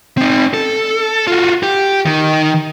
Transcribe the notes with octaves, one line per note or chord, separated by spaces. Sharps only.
C4 D#4
A4
F4 F#4
G4
D#3